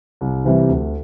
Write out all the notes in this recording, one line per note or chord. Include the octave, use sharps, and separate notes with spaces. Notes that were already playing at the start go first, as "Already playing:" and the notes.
C2
C3 E3 G3 C4
D2